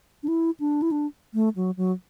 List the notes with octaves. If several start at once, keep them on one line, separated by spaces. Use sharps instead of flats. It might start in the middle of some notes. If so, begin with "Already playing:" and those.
D4
E4
D4
E4
D4
A3
F#3
F#3